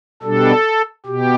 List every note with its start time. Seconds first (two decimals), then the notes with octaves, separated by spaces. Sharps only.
0.23 B2 G3 D4 A4
1.06 B2 G4